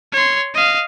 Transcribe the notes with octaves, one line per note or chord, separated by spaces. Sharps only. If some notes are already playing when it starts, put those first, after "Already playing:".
C#5 C6
D#5 F5